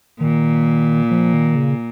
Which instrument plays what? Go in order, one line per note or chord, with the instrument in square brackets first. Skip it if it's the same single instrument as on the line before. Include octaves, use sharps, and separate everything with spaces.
[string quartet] A#2 [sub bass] D#3
[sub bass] F3
D#3
C#3